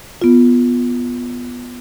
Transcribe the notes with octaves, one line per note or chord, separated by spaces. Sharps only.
B3 F4